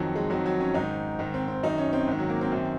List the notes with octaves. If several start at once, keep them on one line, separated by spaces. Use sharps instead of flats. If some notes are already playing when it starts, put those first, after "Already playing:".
Already playing: F2 D#3 F#3
G#3
F2 D#3 F#3
F#3
C#4
G#2 D#3 D#4
G#2 D#3
C4
C4
F#2 D#3 D#4
C#4
C4
G#2 D#3
F#3
A#3
C4
F#2 D#3